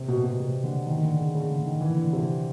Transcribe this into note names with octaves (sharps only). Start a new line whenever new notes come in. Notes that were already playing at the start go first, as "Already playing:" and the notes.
Already playing: C3
B2
B2
C3
D3
D#3
D3
C#3
C#3
D3
D#3
E3
D3
C3